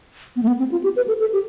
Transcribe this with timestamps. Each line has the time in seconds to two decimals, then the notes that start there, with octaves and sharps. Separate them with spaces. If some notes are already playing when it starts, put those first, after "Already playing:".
0.36 B3
0.43 A3
0.47 B3
0.59 C4
0.72 F4
0.83 G4
0.96 B4
1.08 A4
1.20 A4
1.33 G4